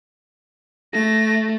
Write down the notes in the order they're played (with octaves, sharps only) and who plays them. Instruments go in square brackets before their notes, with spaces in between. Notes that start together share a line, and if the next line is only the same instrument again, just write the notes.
[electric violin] A3 [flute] A#6